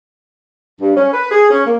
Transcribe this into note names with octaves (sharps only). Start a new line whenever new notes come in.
G2
C#4
B4
G#4
C#4
A#3